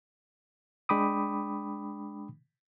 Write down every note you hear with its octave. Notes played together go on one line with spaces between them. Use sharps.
G#3 D4 G5 B5 D6 D#6